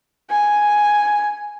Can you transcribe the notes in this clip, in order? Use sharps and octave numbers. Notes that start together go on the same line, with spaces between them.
G#5